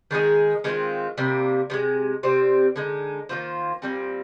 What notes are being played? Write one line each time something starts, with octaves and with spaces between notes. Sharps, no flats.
D#3 G#3 D#4 G#4
D#3 G#3 C4 F4
C3 G3 A#3
C3 D#3 G#3
C3 G3 C4
D3 G#3 D#4
D#3 A#3 F4 C5
A#2 G3 C4